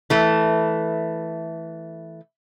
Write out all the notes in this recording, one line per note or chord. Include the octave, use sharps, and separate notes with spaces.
E3 A3